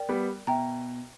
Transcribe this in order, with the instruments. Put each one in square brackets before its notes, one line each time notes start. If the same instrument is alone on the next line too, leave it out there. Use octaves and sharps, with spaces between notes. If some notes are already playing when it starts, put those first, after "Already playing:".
Already playing: [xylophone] A#4 D5 G5
[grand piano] G3 B3
[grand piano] B2 [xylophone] E5 G5 A#5